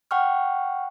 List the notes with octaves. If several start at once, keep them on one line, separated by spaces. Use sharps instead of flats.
F#5 G5 C#6 F6